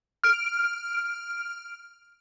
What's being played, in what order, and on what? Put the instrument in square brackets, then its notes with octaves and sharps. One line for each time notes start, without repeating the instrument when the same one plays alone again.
[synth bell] F6 D7